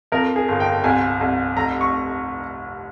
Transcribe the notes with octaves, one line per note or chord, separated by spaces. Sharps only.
F2 A#4
G#4
G1
G5
C2 G#5
C2
F1 A#5
C#6